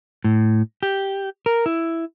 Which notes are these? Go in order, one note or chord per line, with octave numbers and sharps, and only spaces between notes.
A2
G4
A#4
E4